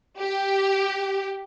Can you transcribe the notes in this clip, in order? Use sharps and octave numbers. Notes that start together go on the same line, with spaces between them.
G4